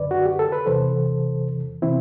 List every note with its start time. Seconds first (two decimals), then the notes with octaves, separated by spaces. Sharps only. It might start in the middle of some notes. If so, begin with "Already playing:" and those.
Already playing: F#2 D3 B4 D5
0.11 F#4
0.26 G4
0.39 A4
0.52 B4
0.66 E2 C3 E3 A4 C5
1.82 C3 E3 C4 E4